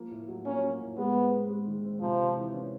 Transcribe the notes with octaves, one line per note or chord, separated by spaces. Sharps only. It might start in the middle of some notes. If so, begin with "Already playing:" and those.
Already playing: F3 A#3
A2
F#3
A#3 C#4
F#3
A2
G#3 B3
C4
C4
G#3
D#3
C4
C3 F3
C3
E3
C#4